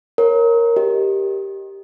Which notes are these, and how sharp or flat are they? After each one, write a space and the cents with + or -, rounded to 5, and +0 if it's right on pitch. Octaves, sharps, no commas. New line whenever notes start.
A#4 +0 C#5 -15
G4 +0 D#5 +0